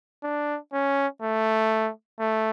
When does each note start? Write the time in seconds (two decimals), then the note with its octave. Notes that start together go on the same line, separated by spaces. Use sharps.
0.23 D4
0.73 C#4
1.22 A3
2.20 A3